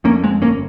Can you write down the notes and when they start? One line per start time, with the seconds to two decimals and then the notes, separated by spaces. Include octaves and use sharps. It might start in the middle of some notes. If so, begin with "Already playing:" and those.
0.04 F2 A#3 C#4
0.24 G#3 C4
0.41 G1 A#3 C#4